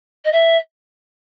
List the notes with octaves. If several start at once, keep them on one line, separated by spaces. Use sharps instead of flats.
D#5
E5